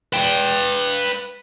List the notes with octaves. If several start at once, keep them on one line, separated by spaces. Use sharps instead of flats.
B4 G5